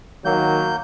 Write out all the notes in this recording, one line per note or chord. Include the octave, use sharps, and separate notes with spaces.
D#3 F#3 A#3 G6